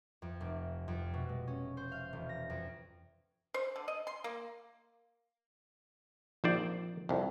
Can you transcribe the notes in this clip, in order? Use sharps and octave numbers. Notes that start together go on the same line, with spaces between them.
F2
F1
F2
B2
G#3
C#4
C5
F5
E1
A#6
F2
C5
D3
D#5
C6
A#3
A#1 F3 D#4 C5 D5
C2 F2